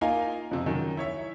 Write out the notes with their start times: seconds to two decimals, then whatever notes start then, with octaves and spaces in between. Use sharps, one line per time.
0.01 A#3 D#4 F4 F5 G#5
0.51 F2 C3
0.66 F#2 D#3
0.97 E4 C#5 E5